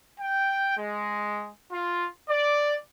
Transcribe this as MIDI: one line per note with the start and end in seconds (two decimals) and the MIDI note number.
0.20 0.78 79
0.78 1.50 56
1.71 2.08 65
2.29 2.76 74